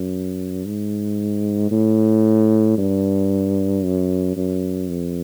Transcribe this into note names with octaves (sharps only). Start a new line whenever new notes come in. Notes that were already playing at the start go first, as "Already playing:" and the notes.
Already playing: F#2
G#2
A2
G2
F#2
F#2
F2